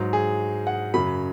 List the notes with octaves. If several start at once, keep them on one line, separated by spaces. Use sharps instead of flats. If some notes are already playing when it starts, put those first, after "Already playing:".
Already playing: G#2 F#3
G#4
F#5
F#2 C#3 F#3 B5